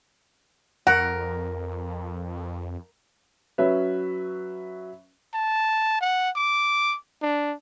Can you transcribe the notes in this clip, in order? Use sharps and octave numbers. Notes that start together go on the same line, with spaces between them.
F2 A#4 F#5
F#3 C#4 B4 E5
A5
F#5
D6
D4